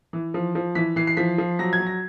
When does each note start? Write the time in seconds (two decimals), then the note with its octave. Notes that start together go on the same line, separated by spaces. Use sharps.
0.13 E3
0.34 F3
0.55 F3
0.75 E3 B6
0.96 E3 C7
1.07 C7
1.17 F3 B6
1.38 F3
1.59 F#3 A#6
1.73 G#6
1.80 F#3
1.87 A#6